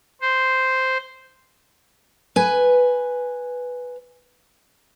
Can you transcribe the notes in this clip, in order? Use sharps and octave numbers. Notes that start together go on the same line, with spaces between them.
C5
B4 G#5